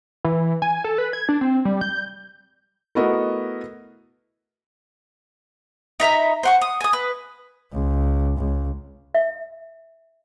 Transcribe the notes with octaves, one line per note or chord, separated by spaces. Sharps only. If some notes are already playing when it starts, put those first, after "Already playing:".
E3
G#5
A4
B4
G#6
D4
C4
G3
G6
A3 B3 E4 F#4 A#4 D#5
D#4 E5 A#5 B5
C5 F#5 C#6
D#6
G#5 D#6
B4
C#2
C#2
E5